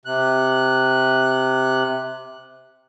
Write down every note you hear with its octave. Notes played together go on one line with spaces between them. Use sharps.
C3 F#6